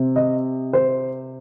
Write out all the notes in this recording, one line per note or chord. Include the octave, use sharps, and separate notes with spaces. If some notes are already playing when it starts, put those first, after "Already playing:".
Already playing: C3
D#5
C5